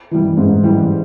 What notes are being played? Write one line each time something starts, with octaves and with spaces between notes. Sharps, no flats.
E3 G3
G#2
E3 G3